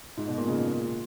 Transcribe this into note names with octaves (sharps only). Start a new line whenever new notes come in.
G#2
B2
A#2
C#3
B2
A#2